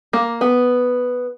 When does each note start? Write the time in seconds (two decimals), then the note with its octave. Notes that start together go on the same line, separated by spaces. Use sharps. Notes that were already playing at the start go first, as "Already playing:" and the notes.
0.13 A#3
0.41 B3